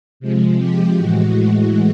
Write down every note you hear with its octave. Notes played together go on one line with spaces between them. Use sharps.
C3 F3 G#3
G4
A2 E3 G#3 F#4